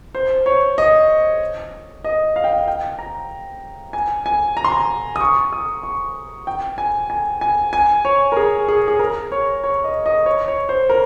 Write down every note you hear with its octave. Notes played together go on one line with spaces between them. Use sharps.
C5
C#5
D#5
D#5
F5
G5
F5
G5
A#5
G#5
G#5
A#5
C6
A#5
D#6
C#6
D#6
C#6
G5
G#5
G#5
G#5
G#5
C#5
A#4
G#4
G#4
G#4
A#4
C#5
C#5
D#5
D#5
C#5
C#5
C5
A#4